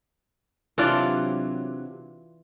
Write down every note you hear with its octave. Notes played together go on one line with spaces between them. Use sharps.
C3 E3 F#3 D4 F4 D5